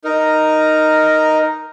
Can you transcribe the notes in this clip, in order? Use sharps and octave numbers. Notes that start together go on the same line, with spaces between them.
D#4 A#4